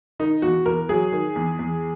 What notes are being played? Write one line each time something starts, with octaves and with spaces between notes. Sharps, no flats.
D#3 D#4
E2 F#4
E2 A#4
F#3 G#4
D#3
E2
E2